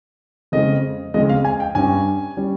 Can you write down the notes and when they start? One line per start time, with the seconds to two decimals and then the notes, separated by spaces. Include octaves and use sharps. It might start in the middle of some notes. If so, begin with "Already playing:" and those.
0.52 F2 C#3 G#3 D#5
1.14 F2 C#3 G#3 D#5
1.29 F5
1.45 G#5
1.60 G5
1.75 G2 G3 C#4 G#5
2.37 G3 C#4